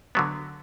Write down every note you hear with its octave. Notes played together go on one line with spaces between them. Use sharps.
D3 F#3 B3